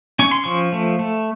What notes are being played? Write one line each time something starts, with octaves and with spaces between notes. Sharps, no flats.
C#4 C#6
C6
F3 C#6
A3
A3